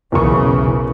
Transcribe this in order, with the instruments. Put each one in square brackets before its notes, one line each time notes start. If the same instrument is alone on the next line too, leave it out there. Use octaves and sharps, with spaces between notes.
[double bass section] B1 C#3 E3 [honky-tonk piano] E2 A#4 C#6